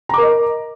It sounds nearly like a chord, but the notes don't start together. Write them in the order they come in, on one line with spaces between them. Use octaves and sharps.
A#5 D6 A#4 D#5